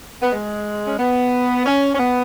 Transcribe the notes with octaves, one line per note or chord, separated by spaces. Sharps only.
B3
G#3
C#4
B3
C#4
C#4
B3